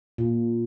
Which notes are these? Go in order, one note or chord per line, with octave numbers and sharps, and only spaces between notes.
A#2